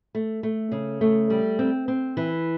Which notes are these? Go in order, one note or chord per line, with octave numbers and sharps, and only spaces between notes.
A3
A3
C#3
A3
G3
C4
C4
E3